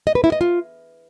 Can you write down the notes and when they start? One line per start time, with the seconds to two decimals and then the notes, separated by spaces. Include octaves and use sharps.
0.07 D#5
0.15 B4
0.24 E4
0.32 D#5
0.41 F4